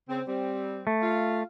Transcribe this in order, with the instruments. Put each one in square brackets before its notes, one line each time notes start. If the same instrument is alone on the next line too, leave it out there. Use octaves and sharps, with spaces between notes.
[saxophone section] C#3 C4
G3 C4
[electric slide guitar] A3
[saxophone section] F4 F5